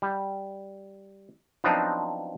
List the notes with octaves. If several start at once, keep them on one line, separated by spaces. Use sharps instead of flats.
G3
F3 F#3 B3 C4 D4 D#4